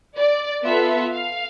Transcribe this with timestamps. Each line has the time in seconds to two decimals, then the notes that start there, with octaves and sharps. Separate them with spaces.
0.16 D5
0.64 B3 F4 A4 E5
1.11 F5